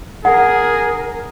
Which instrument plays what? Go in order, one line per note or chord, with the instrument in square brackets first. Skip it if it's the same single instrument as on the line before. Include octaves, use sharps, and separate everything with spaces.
[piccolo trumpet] G#4 [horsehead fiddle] A#4 [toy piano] F#5